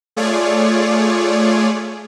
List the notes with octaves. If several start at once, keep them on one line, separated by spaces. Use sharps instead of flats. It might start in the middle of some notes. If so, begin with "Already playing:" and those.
A3 F4 G#4 C#5 D5